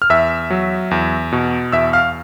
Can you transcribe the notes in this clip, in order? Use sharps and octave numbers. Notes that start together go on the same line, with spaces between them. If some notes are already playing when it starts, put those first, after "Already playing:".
F6
E2 E5 E6
F#3
E2
B2
E2 E5 E6
F5 F6